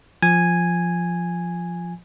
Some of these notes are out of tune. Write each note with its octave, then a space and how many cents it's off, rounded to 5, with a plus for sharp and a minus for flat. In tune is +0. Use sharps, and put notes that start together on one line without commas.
F3 +0 G#5 -5